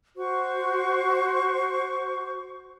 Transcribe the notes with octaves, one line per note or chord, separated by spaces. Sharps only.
F#4 C5 C#6